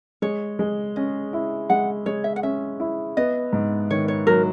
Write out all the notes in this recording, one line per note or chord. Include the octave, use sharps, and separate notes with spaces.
G#3 C#5
G#3
C#4 D#5
E4
G#3 F#5
G#3 C#5
E5
F#5
C#4 E5
E4
B3 D#5
G#2
D#3 C#5
C#5
F#3 A#4